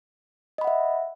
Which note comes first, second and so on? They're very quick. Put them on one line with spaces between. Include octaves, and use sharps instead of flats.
D#5 B5 F#5 E5